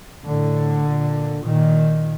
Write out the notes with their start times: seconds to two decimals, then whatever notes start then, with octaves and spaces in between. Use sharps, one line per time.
0.24 A2 D3
0.85 A#2
1.45 A#2 D#3